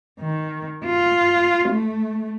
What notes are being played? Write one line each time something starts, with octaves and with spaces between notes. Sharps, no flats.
D#3
F4
A3